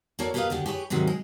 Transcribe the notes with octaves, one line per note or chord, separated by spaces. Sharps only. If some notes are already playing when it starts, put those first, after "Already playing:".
A#3 F#4 A4 C#5 D5
A#3 G4 B4 C5 D#5 F5
D#2 D3 F#4 G4
G4 G#4 B4 C#5
G#2 C3 D#3 F#3 G#3
G#3